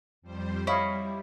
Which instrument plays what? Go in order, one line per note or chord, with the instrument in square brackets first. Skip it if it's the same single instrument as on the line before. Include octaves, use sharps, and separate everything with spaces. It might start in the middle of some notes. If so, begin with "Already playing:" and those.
[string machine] F2 G3 C5
[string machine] G3 [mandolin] E4 [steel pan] C#5 D#5 F5